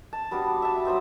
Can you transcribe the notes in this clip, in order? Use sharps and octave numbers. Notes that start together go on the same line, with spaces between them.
A5
G3 B3 D4 F#4
E5 A5
F#3 B3 C5 E5